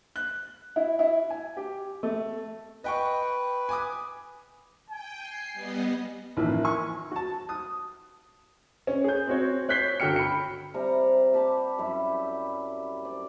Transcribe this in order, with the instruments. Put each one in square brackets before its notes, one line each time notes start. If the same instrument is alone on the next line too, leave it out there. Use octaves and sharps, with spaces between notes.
[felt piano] F#6
E4
E4
G#5
G4
A3
[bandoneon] B4 [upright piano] D#5 G5 C#6
[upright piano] G#5 D6 D#6
[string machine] G5 [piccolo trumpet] G#5
[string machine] C7
G3 B3 D#5
[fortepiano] A1 D#2 E3 F3 A#3 E5
G#5 C#6
F#4 A5
D#6
[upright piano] C#4
G#4 G6
C4 F#4 C#5
C#5 F#6 G6 B6 C7 G7
G1 F#4 G5 F6 C#7
B5 C#7
[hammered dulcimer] C3 G3 A#5
G4 A5 B5
F#2 G3 E4 G4
D5